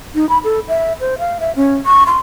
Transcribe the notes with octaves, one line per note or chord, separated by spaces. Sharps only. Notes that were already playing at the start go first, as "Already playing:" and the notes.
D#4
B5
A4
E5
C5
F5
E5
C#4
C#6
C6